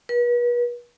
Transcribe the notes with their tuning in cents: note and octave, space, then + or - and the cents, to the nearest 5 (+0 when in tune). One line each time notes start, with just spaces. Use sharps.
B4 -40